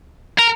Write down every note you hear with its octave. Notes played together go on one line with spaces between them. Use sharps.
A#4